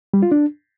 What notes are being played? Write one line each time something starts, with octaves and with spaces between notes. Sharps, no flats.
G3
F4
D4